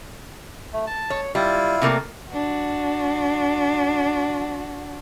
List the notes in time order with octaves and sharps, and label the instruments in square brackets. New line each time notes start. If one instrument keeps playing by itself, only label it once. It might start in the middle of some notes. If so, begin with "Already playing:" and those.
[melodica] A3
A5
[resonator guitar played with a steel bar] C#5
[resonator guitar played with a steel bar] G3 [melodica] E4 F4
[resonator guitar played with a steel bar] C3 A3 A#3
[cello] D4 F#4